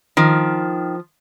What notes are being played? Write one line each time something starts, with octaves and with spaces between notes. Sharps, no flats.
D#3 F3